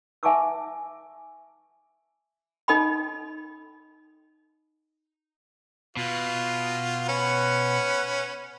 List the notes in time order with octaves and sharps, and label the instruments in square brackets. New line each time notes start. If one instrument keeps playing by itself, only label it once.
[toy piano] E5 G#5 A5 C#6 D6 E6
D#4 A4 D#5 G5 B5
[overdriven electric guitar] B2 [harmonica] F4
[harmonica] C#4 B4 F#5